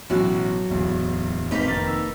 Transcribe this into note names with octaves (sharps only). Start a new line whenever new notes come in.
A1 B2 F#3 E4 F#4
D1 E2
G#1 A#3 C4 D#4 B4 B6
F1 D#3 A6
E6